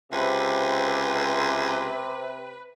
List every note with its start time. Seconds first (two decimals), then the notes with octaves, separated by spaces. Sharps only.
0.12 C#2 C3 B4